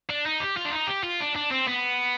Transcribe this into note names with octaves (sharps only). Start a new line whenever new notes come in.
D4
D#4
G4
F4
D4
D#4
G4
F4
D4
D4
C4
B3